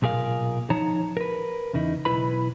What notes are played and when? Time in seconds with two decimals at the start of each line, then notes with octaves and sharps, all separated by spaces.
0.02 B1 A#2 G#4 A#4 F5
0.70 F3 D#4 C#5 A5 A#5
1.17 A#4 B4
1.73 E2 C#3 D#4 E4
2.05 B1 E4 B4 B5